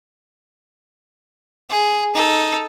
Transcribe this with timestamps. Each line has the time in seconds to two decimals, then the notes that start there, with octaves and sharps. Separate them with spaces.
1.70 G#4
2.15 D#4 A4